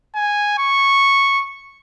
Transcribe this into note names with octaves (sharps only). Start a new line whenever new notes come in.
G#5
C#6